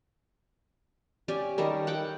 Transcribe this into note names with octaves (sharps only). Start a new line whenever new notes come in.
C#4 G4 D5 G#5
D#3 G3 A4 A#4
F#5 G5 D6